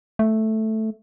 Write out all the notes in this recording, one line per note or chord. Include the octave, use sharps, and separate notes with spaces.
A3